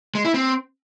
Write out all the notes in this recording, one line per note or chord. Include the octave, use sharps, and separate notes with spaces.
G#3
E4
C4